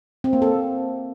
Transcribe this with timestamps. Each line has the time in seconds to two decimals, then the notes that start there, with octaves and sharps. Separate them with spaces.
0.24 C4
0.33 A#3
0.42 A4